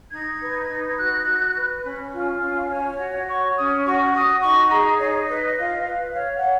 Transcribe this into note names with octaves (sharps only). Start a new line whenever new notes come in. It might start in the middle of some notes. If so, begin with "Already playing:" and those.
D#4 G#6
B4
D#4
G#6
F#4 F#6
F#4
B4
C#4 B5
F4
C#4
C#5 G#5
F#4 F#5
C#5 C#6
C#4 D#6
F#4 C#6
F#4 D#6
D#4 C#6
G#4 A#5
D#4 C#5
B4 D#5
F4
B4
C#5 F5
F#5
C#5